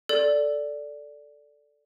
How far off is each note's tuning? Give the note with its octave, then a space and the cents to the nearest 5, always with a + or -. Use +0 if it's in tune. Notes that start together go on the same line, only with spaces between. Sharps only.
A4 +0 D5 -5